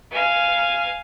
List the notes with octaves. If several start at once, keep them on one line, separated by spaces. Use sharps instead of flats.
F5 G#5